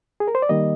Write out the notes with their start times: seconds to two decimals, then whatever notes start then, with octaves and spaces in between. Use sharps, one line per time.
0.20 G#4
0.28 A#4
0.35 C5
0.42 D5
0.49 D#3 G3 A#3 D#5